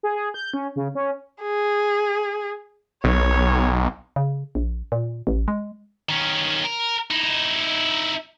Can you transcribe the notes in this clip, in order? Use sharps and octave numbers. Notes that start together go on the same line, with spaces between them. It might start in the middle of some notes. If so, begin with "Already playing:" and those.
G#4
G#4
G6
C#4
C#3
C#4
G#4
B1 C#5
C#3
A#1
A#2
A1
G#3
D#3 C#4
A#4
D#4 E4